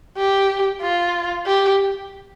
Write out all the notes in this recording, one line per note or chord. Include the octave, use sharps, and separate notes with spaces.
G4
F4
G4